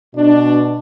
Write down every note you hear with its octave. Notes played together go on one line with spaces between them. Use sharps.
B2 D4